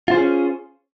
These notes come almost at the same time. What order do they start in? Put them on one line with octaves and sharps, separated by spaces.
F4 C5 G#4 C#4